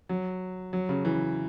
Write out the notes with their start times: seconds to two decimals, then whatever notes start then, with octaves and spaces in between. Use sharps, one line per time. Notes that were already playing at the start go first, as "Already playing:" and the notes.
0.09 F#3
0.73 F#3
0.89 C#3
1.05 E3